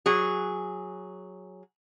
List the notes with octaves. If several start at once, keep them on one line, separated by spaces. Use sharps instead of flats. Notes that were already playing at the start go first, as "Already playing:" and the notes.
F#3 G#4